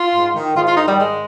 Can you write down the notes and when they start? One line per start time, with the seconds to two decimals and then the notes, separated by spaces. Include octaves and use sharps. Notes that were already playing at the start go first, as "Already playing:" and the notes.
Already playing: F4
0.13 G#2
0.34 D#3
0.55 G#2 F4
0.65 F4
0.75 D#3 D#4
0.86 G3
0.96 G#2 G#3